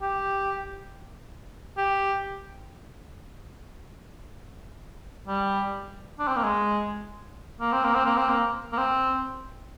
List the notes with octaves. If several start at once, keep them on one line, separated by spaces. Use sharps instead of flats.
G4
G4
G3
D4
C4
A#3
G#3
A#3
C4
A#3
C4
A#3
C4
A#3
A#3
C4